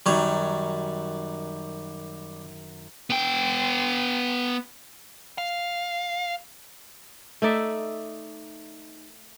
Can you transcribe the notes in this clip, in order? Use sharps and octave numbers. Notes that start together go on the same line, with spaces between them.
F#2 D#3 G3 C#5
B3 G5
F5
A3 D#4 D5 E5